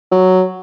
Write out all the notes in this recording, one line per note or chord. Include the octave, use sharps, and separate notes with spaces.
F#3